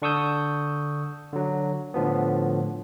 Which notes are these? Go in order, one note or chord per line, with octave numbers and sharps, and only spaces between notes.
D3 D4 C#6 D#6 E6 G6
D3 F#3
A2 D3 F3 B3